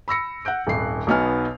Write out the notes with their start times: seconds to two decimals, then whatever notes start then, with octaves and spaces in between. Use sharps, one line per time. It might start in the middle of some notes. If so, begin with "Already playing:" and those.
0.08 B5 E6 A#6 C#7
0.45 F#5 F#6 G6 D7
0.67 D#1 G#1 C7
1.07 B1 B2 B3 D#4 G#5 F6